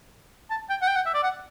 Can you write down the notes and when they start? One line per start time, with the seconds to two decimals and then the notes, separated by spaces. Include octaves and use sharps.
0.50 A5
0.70 G5
0.82 F#5
0.88 G5
0.96 F#5
1.06 E5
1.14 D5
1.23 F#5